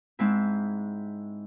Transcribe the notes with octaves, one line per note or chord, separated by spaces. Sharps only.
G#2 G#3 C4 E4